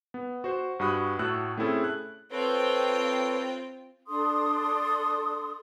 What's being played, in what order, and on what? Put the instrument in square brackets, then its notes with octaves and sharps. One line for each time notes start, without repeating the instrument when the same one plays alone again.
[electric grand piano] B3
F#4 C5
G2 F#4 B5 D#6 F#6
A2 A3 F#4 E6 F#6
A3 C4 C#4 E4 G#4 A4
F#6
[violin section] C4 F4 G5 [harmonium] A4 B4 C#5
[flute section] D4 A4 C6 D#6